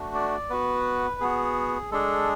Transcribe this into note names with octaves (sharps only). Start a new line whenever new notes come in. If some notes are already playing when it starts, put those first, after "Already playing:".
Already playing: A3 D4 F#4
D5
B3 F#4 B4
B3 F#4 G#4
G#3 D4 G#4 A4